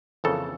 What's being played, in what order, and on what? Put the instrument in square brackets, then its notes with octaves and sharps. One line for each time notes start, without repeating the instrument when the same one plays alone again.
[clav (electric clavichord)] F2 C#3 E3 A#3 A4